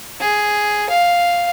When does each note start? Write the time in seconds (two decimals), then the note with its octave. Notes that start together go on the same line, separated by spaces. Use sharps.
0.21 G#4
0.90 F5